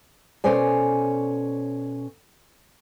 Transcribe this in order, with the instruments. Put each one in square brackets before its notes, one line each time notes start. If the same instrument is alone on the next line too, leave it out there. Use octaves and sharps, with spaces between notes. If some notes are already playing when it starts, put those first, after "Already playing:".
[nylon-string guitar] B2 C#4 A4 C5 D5 G#5